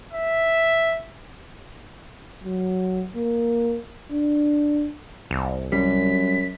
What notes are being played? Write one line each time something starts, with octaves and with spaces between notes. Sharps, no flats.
E5
F#3
A#3
D4
C2
F#2 G3 B6